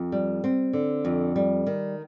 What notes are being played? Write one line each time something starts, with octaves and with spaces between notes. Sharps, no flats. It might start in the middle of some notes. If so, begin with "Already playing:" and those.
Already playing: F2
G3
C4
D3
F2
G3
D#3